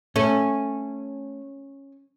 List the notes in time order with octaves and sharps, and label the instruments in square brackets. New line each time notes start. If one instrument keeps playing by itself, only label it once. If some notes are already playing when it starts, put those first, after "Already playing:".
[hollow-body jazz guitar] A3 [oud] C#4